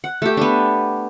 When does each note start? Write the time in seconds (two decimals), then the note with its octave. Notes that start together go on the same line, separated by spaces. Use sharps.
0.04 F#5
0.22 A3 G4
0.37 B3 D4